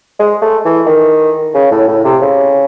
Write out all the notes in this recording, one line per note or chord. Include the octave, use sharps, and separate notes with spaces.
G#3
A3
E3
D#3
C#3
A2
A2
C3
C#3